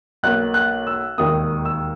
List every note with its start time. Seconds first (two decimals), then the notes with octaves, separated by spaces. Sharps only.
0.23 B1 B2 A#3 F#6
0.54 F#6
0.87 E6
1.18 E1 D#2 D#3 A#3 D#6
1.65 E6